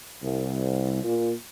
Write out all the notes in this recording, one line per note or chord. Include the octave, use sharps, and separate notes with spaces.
C2
A#2